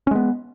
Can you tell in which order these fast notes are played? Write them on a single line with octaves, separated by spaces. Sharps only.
C#4 G#3 B3